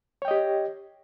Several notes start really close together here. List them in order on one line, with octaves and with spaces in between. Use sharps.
C#5 G5 D#5 G4